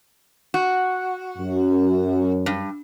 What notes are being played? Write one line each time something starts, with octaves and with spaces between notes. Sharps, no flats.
F#4
F#2
G2